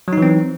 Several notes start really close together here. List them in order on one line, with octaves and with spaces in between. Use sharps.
F#3 D#4 E3 C4